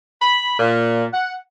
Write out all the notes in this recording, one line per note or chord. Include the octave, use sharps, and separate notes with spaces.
B5
A#2
F#5